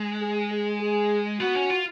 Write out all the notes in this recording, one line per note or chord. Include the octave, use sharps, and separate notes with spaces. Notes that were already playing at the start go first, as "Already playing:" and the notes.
Already playing: G#3
G#4
G#4
G#4
B3 F#4
C#4
F4